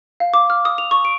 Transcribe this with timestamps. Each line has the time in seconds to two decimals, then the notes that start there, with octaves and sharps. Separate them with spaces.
0.20 F5
0.34 D6
0.50 F6
0.65 D#6
0.78 F7
0.91 C#6
1.05 D7